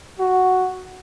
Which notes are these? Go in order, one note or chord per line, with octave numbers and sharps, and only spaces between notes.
F#4